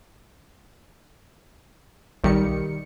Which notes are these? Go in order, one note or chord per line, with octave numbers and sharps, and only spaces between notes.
B1 D#3 G3 C#7